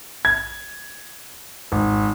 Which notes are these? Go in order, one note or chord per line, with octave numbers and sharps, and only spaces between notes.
G#6
G#1